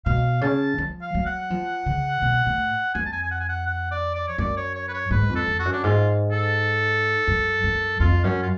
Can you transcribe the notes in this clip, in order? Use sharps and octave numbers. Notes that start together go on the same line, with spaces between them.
B2 F5
C#3 A5
F3
F5
F#3
F#5
F3
C#3
B2
A2
F2 G#5
A5
G#5
G#5
F#5
G#5
F#5
F#5
D5
D5
C#5
F#2 D5
C#5
C#5
B4
C#5
G#2 B4
F2
A4
F2
F#4
F#2
D4
G#2 F4
A4
F#2
F#2
F2 F4
F#2 C#4
F4